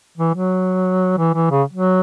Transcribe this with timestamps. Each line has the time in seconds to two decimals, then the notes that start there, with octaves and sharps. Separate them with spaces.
0.17 E3
0.34 F#3
1.18 E3
1.34 E3
1.51 C#3
1.73 F#3